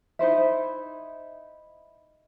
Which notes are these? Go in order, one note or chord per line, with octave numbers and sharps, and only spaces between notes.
D#4 E4 C5 E5